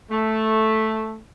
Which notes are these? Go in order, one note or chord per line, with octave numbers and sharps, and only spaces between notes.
A3